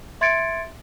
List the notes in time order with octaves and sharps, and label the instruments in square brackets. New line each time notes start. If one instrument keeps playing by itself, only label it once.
[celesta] E5 C6 G#6 A6 C#7 D7